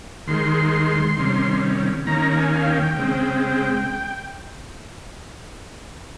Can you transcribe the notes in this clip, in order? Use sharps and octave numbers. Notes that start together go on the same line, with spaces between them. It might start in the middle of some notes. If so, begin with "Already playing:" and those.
D#2 D#3 G#3 C6
C3 D#3 G3 C#4
D#2 D#3 A#3 C#4 A#5
A#5
G#5
F5
G5
C#3 G#3 C4